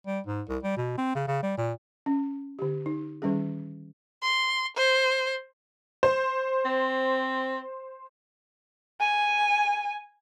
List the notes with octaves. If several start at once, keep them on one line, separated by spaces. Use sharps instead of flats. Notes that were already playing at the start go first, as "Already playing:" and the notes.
G3
G#2
C2
G3
B2
C4
C#3
C#3
G3
A#2
C#4
D3 G4
D#4
D#3 G3 C#4 G#4
C6
C5
C5
C4
G#5